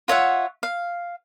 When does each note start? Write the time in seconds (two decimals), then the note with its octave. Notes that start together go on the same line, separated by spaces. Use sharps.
0.08 F4 C#5 E5 F#5
0.63 F5